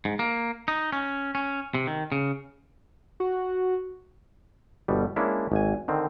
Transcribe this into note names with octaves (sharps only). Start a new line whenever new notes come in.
G#2
A#3
D#4
C#4
C#4
C3
D#3
C#3
F#4
G1 B2 G3
G#3 A#3 C#4 D4 E4
G#1 G#5
D3 D#3 C4